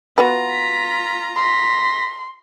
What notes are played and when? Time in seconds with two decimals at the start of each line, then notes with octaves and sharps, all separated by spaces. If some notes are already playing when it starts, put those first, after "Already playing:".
0.18 B3 F4 F#4 B4 A#5
0.50 B6
1.36 C6 A#6 B6